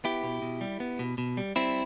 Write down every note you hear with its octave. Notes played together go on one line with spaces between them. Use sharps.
B3 E4 G4
B2
B2
G3
B3
B2
B2
G3
G3 C4 E4